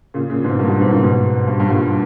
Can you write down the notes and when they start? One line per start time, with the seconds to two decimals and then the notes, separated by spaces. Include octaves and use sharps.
0.14 A#2 C#3
0.30 A#2 C#3
0.44 G#2 B2
0.59 G2 A#2
0.69 G2 A#2
0.81 G#2 B2
0.92 A#2 C#3
1.04 G#2 B2
1.47 G2
1.60 G2
1.70 G2 A#2